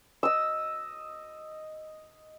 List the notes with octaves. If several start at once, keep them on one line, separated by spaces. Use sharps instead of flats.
D#5 E6